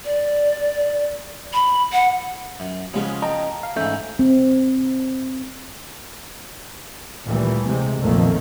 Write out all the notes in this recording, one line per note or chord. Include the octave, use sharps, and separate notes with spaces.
D5
B5
F#5
F#2
C#3 F3 G#3 B3 C#4
D#5 G5 A5 A#5
F5
G#2 E3 A3 C#4 G6
C4
D2 A#2 E3 G3 A3
C3 G#3
B1 F2 A#2 D#3 A3 A#3